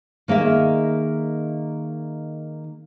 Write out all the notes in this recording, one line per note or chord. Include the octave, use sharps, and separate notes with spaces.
D#3 A#3 G#4 E5